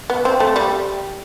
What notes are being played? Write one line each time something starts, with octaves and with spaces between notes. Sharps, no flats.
B3
C4
A3
G3